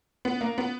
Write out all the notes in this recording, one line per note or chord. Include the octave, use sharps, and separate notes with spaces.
B3
A#3
B3